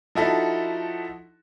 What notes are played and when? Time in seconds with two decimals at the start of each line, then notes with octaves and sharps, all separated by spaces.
0.15 F3 D#4 E4 F#4 A4